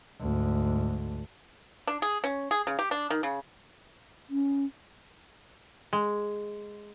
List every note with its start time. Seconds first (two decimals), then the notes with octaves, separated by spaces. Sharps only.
0.20 D2 G#2
1.87 D4
2.02 G#4
2.24 C#4
2.51 G#4
2.67 C#3
2.79 G4
2.91 D4
3.10 D#3
3.23 C#3
4.30 C#4
5.93 G#3